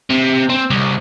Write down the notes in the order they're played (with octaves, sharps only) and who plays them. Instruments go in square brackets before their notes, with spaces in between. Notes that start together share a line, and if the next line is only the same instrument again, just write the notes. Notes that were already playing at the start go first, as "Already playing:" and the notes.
[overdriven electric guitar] C3
C4
C2